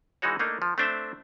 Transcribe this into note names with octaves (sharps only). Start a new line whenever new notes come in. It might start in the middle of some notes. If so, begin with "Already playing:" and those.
E3 G#3 D#4 F#4 C#5
A3 A#3 D4 D#4
F3
A3 C4 D4 C5 E5